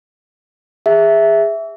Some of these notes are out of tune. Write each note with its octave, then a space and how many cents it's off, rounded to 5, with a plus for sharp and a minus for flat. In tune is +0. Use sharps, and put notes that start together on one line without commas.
G#4 -20 E5 +0